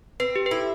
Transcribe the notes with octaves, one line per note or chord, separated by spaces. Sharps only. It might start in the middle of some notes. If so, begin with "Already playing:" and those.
C4 B4
G4
B4
E4 A4